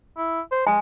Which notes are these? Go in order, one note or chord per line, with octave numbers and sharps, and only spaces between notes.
E4
C5
G#3 G#5